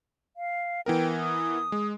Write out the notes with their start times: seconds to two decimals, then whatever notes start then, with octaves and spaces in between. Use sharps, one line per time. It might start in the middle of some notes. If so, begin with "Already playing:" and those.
0.37 F5
0.86 E3 B3 A#4 G5
1.19 D#6
1.72 G#3